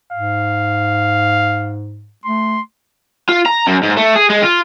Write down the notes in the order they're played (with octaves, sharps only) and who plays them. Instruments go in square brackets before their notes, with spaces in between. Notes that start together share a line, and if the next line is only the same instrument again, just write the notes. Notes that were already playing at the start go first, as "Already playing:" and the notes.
[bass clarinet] G#2 [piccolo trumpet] F5
[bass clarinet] A3 [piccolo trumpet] C6
[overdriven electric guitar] F4
A#5
F#2
G#2
A3
G#4
G#3
F4